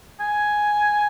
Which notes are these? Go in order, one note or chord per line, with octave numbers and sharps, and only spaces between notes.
G#5